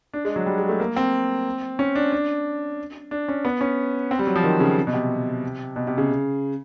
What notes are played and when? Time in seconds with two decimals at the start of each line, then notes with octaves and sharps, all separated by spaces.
0.14 D4
0.25 G#3
0.36 F#3
0.46 G3
0.58 G#3
0.69 A3
0.80 A#3
0.96 C4
1.79 C#4
1.95 D4
2.12 D4
3.11 D4
3.28 C#4
3.45 B3
3.61 C#4
4.11 C4
4.19 G3
4.27 F#3
4.36 F3
4.44 D#3
4.60 C#3
4.87 B2
4.93 C3
5.76 B2
5.87 C3
5.98 C#3